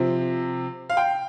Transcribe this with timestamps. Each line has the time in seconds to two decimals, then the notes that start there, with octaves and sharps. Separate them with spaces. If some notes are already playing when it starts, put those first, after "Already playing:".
Already playing: C3 F3 C4
0.90 F5
0.97 G5